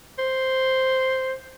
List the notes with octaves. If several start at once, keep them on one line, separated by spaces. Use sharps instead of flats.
C5